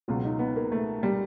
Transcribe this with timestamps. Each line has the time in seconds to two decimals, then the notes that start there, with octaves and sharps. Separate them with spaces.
0.08 C#2 B2 F#3 F4
0.24 D#4
0.39 B3
0.56 A#3
0.72 A3
1.03 G3